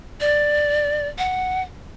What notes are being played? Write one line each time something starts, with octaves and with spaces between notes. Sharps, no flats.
D5
F#5